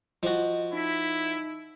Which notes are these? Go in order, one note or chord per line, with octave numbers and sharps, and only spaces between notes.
F3 F#4 D#5
D#4 E4 B6